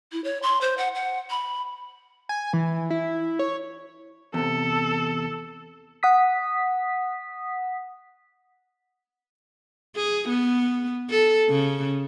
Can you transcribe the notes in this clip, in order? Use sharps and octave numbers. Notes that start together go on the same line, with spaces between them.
E4
C#5
C6
C5
F#5
F#5
B5
G#5
E3
E4
C#5
E2 C3 A4
F#5 D#6 B6
G#4
B3
A4
C#3